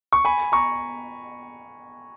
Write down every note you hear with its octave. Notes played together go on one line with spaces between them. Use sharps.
C#6
G#5 B5
A#5 C#6